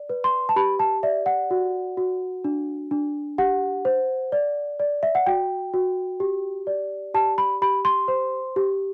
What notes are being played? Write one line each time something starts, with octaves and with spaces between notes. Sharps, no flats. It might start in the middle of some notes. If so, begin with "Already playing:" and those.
Already playing: D5
B4
C6
A5
G4 B5
A5
D5 E5
F#5
F#4
F#4
D4
D4
G4 F#5
C5
D5
D5
E5
F#5
F#4 G5
F#4
G4
D5
G4 A5
B5
G4 B5
C6
C5
G4